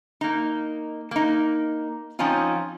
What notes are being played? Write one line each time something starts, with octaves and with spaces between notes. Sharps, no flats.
A#3 D#4
A#3 D#4
F3 C4 C#4 D#4 F4